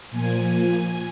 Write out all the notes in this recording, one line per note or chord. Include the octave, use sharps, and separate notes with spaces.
A#2 F3 A#3 G#5